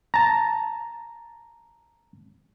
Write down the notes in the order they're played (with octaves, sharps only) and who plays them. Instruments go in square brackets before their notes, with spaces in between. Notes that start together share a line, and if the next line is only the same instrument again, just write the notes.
[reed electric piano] A5 A#5